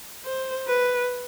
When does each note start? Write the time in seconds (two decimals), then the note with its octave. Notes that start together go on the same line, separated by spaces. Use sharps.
0.25 C5
0.67 B4